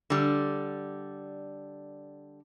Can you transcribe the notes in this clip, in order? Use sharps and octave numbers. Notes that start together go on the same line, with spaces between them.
D3 G3